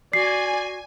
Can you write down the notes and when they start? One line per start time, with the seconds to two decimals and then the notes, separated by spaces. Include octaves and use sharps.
0.13 F#4 D5 G#5 C7